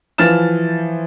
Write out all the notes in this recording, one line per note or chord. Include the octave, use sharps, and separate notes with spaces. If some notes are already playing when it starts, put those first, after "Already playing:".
E3 F3 F6 A6 E7